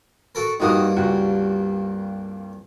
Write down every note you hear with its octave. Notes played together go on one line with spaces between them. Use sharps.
F#4 A4 A#4
C2 G2 A#3 D#4 F#4 D#6
C#2 F#4